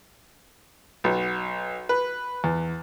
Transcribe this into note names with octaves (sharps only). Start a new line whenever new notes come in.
B1
B4
E2